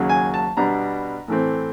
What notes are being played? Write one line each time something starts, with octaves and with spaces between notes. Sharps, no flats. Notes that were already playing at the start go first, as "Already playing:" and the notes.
Already playing: D#2 C#3 F#3
G#5
A5
B2 G3 B3 D4 A#5
A2 E3 A3 C4